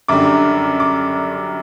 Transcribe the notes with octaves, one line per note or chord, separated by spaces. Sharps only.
F#2 D3 G3 D6
D6